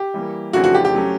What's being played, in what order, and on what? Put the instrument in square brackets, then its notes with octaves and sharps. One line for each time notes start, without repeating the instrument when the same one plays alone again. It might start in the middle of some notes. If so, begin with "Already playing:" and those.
Already playing: [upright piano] G4
[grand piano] E3 G3 A#3
[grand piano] F2 C#3 E3 A3 D4 [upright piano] F#4
[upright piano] F#4
G4
G4
[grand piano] F#3 A3 C#4